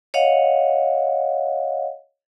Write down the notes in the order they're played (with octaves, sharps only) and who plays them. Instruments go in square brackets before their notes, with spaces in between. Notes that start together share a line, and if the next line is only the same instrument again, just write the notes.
[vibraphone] C#5 D#5 F5 F#5